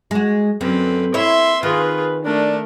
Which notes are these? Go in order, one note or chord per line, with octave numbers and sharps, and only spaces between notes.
G#3 F#4
F#2 D3 C4 B4
E4 C#5 E5 C6
D#3 F4 G#4 B4
A3 D4 A#4